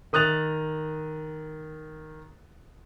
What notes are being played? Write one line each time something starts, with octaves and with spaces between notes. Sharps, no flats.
D#3 D#6 F#6 A6 F7